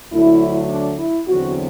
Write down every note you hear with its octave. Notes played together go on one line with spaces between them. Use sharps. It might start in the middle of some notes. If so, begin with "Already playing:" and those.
D2 D3 F#3 A3 E4
D4
E4
E2 D3 F#3 C4 F#4